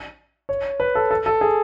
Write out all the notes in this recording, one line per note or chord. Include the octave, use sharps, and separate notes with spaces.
C#5
B4
A4
A4
A4
G#4